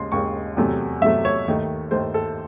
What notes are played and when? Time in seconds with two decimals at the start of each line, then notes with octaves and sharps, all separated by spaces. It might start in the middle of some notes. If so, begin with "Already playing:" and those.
Already playing: D#2 C#3 G#3 C6
0.12 D#2 C#3 G#3 C#6
0.57 E2 C3 F#3 A3
1.01 E2 C3 F#3 A3 E5
1.25 C#5
1.47 D#2 D#3 A3
1.91 D#2 D#3 A3 C5
2.14 A4